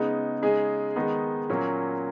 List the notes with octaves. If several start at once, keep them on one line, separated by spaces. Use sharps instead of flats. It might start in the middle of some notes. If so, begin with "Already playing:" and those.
Already playing: C#3 G#3 B3 D#4
C#3 G#3 D#4 G#4
D#3 G#3 B3 D#4
A#2 F#3 A#3 C#4